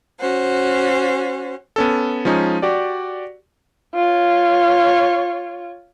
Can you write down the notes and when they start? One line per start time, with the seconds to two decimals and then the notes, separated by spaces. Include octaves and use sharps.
0.19 C#4 F#4 C5
1.76 B3 C#4 A4
2.25 F3 G#3 C#4 D#4
2.62 F#4 G4 D5
3.94 F4 C#5